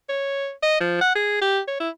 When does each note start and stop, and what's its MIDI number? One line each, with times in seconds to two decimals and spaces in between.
0.09 0.51 73
0.63 0.79 75
0.80 0.99 53
1.01 1.11 78
1.16 1.38 68
1.42 1.60 67
1.68 1.77 73
1.80 1.90 64